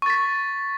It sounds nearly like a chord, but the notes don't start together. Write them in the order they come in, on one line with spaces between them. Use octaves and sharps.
C#6 A6 B6